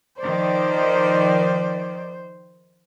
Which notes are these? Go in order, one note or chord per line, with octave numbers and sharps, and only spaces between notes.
D#3 F3 C5 D5